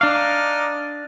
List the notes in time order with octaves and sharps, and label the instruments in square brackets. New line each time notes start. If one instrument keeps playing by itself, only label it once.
[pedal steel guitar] D4 F5 [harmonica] D#4 D6 F6